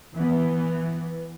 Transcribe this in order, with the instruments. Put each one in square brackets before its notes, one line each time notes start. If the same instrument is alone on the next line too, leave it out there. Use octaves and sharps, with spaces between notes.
[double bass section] E3 B3